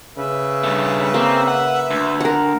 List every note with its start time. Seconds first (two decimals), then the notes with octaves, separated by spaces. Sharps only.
0.17 C#3 B4 E5
0.64 G2 A3
1.14 A#3 C4
1.48 F#5
1.90 D2
2.21 A#4 F#5